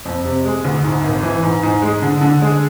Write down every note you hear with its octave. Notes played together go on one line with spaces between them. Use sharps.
F2
C3
G#3
D2
G#2
G#1
E3
G#2
G#2
G#3
D3
D3
G#3